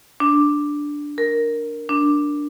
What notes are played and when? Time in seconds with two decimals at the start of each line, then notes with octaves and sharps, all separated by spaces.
0.20 D4
1.18 A#4
1.89 D4